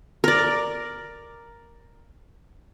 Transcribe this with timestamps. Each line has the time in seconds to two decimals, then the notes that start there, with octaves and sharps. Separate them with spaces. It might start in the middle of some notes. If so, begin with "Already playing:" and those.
0.24 A#4 D5